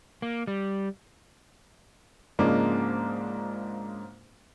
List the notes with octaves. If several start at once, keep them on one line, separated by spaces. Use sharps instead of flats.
A#3
G3
G#2 C#3 F3 G#3 A#3 D4